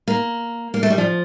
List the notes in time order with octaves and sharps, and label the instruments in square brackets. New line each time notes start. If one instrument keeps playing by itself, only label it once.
[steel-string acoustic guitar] A#3
A#3
A3
G3
F3